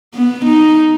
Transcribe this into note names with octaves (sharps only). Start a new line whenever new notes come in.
B3
D#4